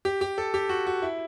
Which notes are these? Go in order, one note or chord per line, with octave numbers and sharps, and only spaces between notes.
G4
G4
A4
G4
F#4
F#4
E4